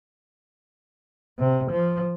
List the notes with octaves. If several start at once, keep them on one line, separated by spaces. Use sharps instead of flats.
C3
F3